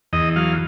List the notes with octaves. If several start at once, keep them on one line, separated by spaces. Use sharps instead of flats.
E2 D#5
F#3 F5